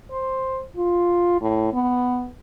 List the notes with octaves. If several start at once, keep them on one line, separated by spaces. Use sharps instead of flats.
C5
F4
A2
B3